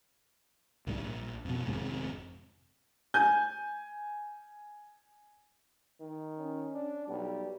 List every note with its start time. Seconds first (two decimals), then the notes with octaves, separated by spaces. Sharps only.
0.87 C2 G#2 G3
1.03 A#1
1.45 F2 B2
1.66 G#1 F2 G#2 C3
3.14 G#5 G6
6.01 D#3
6.39 C#4
6.74 D4
7.08 B1 G3